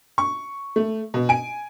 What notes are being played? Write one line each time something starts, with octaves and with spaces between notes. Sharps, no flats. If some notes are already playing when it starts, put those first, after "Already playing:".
C#6
A3
B2
G#5 D7